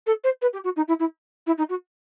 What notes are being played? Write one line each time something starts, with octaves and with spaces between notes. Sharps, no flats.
A4
C5
B4
G4
F#4
D#4
E4
E4
E4
D#4
F#4